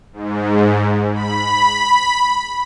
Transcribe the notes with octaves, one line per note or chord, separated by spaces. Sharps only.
G#2
B5